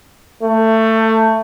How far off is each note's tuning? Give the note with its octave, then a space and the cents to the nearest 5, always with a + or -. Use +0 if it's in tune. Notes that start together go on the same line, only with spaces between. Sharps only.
A3 +20